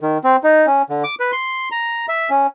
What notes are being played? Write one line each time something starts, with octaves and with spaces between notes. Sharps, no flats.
D#3
C4
D#4
C#4
D3
D6
B4
C6
A#5
E5
C#4